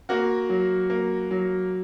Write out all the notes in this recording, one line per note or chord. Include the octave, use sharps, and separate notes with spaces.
A#3 F#4
F#3
A#3
F#3